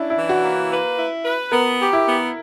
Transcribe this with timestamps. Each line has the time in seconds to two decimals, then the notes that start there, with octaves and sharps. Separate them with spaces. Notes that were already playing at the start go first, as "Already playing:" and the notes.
Already playing: C#4 D4 E4
0.10 E4
0.17 E3
0.29 F#4
0.43 A#3
0.71 B4
0.98 E4
1.25 B4
1.52 B3 A#4
1.79 G4
1.93 E4
2.06 B3